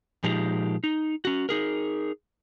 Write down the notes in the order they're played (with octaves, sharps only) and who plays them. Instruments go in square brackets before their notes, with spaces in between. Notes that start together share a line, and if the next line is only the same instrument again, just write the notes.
[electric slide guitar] A#2 F3 G#3 D#4 G4
D#4
C#4 F#4
D#4 G#4 A#4